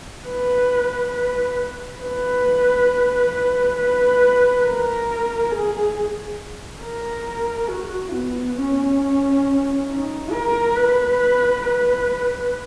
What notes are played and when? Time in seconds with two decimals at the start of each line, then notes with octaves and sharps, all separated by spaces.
0.27 B4
1.13 B4
2.01 B4
3.32 B4
3.76 B4
4.63 A#4
5.50 G#4
6.81 A#4
7.68 F#4
8.12 B3
8.57 C#4
9.87 D#4
10.31 A#4
10.75 B4
11.62 B4